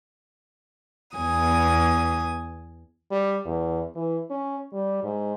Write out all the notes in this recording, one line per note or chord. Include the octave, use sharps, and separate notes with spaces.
E2 B3 G#5 D#6
G3
E2
E3
C#4
G3
G#2